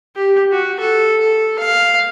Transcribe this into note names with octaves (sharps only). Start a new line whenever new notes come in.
G4
F#4
A4
A4
F5